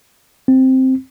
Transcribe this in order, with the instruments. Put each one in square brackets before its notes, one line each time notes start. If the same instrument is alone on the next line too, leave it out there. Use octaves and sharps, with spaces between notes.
[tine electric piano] C4